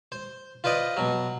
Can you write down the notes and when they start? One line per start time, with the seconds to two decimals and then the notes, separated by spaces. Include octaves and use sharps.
0.12 C5
0.64 F4 B4 C5 D5 D#5
0.97 B2 F#3